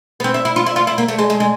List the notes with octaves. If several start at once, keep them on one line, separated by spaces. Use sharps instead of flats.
B3
C4
E4
E4
F4
E4
F4
E4
A#3
A3
G#3
G#3
G#3